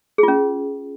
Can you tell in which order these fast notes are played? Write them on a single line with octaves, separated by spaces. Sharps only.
G#4 F4 C#4